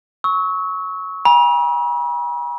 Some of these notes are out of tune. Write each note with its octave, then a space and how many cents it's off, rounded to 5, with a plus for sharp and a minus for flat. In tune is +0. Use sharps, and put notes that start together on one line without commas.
C#6 +5 E6 -35
G#5 -30 B5 -45